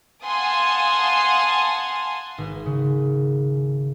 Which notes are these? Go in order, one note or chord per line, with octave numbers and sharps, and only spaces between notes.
F5 F#5 G#5 A5 C6 D#6
G#1
C#3